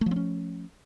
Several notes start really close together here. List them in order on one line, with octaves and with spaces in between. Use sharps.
A3 F3 C4 C#4